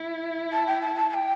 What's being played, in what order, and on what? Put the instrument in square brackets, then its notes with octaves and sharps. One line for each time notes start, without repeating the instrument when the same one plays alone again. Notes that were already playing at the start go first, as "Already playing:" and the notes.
Already playing: [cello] E4
[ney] A5
G5
A5
A5
A5
G5